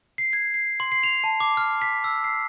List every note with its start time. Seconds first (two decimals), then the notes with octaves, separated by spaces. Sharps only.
0.18 C7
0.33 G#6
0.54 C7
0.80 C6
0.92 C7
1.03 F7
1.24 A5
1.40 D6
1.57 F6
1.82 B6
2.04 E6
2.24 C7